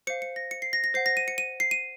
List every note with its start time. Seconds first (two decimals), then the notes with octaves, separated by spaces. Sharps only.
0.07 C5 C#7
0.10 F5
0.22 C#7
0.36 A#6
0.51 C#7
0.62 C7
0.73 A#6
0.84 A#6
0.94 C5 F#5 C7
1.06 A#6
1.17 D#7
1.28 C#7
1.38 D#7
1.60 C7
1.71 D#7